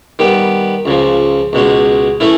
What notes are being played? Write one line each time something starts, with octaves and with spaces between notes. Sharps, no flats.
D#3 G3 B3
C#2 C#3 F3
C#2 B2 G#3 C#4
E3 A3 C#4 E4